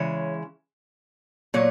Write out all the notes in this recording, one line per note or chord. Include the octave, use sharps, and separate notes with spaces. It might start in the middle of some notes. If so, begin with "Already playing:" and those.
Already playing: C#3 E3 G#3 C#5
A#2 F#3 C#5